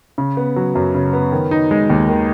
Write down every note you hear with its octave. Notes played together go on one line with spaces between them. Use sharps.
C#3
B3
F#3
F#2
C#3
B3
D#3
D#4
G#3
D#2
D#3